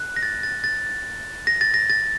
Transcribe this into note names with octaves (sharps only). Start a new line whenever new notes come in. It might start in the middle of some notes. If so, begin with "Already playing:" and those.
Already playing: F#6
A#6
A6
A6
A6
A#6
A6
A#6
A6